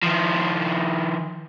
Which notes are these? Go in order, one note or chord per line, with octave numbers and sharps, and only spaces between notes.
D#3 F3